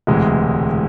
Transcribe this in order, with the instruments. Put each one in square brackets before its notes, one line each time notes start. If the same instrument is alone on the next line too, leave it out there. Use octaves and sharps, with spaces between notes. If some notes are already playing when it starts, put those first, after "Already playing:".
[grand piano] E1 D2 C3 E3 G#3